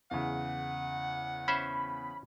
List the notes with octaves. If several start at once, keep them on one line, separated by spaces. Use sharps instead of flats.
E2 C#3 F#5
C#4 C5 E5 B5